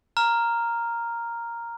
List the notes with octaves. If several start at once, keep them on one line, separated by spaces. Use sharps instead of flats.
A#5 F6